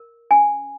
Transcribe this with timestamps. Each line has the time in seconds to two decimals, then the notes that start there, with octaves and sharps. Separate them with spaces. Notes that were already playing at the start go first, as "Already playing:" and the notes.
Already playing: A#4
0.31 C#4 G#5